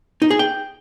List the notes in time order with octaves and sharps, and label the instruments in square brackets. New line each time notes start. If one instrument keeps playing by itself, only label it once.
[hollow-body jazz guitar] D#4
G#4
G5